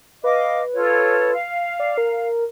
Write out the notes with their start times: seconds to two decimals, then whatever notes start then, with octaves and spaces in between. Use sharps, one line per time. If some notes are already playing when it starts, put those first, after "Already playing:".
0.24 B4 D#5 F5 D6
0.74 F4 A4 C#5
1.33 F5
1.80 D5
1.98 A#4